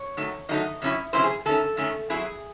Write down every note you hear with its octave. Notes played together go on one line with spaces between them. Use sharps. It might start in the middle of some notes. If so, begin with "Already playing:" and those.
Already playing: C#5
D#3 F#3 A3 D#4
D#3 F#3 A3 D#4 D#5
C3 F#3 C#4 E4
C3 F#3 C#4 E4 C5
G#4
D#3 A3 C#4 A4
D#3 A3 C#4
F#3 C4 E4 G#4